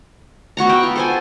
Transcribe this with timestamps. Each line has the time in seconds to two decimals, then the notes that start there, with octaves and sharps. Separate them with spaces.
0.57 B3 F#4 F#5 A#5
0.69 E5 G5
0.83 F4
0.96 A4 C5 G#5